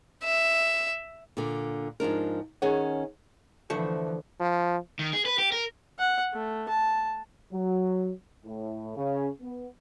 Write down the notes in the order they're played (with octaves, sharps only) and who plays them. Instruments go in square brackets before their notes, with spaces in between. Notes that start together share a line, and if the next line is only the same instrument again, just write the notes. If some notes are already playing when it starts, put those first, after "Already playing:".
[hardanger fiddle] E5
[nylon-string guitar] A#2 D3
G#2 F3 D4 A#4
D#3 C#4 G#4 C#5 F#5
[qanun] D3 A3 C5 [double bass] E3 F3
[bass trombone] F3
[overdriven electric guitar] D#3
G#4
B4
G4
A#4
[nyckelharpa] F#5
A3
A5
[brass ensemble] F#3
A2
C#3
B3